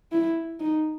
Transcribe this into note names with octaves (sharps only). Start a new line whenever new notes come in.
E4
D#4